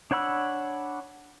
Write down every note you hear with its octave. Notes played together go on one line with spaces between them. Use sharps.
D4 C#5 F#5 B5 E6